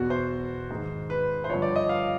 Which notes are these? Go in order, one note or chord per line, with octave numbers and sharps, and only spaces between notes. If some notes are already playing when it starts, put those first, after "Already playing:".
Already playing: E2 B2 F#4
C5
G#2 D#3
B4
C5
G2 D3 F3 C#5
D5
D#5
F5